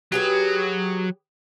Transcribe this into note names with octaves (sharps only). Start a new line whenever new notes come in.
F#3 G4 G#4 B4